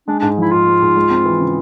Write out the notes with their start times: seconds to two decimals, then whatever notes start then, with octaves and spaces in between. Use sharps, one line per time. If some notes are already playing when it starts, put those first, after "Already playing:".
0.08 G#3 D4
0.19 G#2 D4
0.37 F3 E4
0.52 G#2 F4
0.66 G#3
0.82 G#2
0.96 G#3
1.10 C4
1.25 E3
1.40 C#3